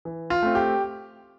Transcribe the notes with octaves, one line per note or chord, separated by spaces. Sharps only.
E3
F4
A3 C4
G4